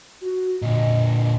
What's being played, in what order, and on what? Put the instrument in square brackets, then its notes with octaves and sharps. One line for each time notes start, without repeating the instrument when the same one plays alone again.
[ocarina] F#4
[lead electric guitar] A#2 D3 [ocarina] D#5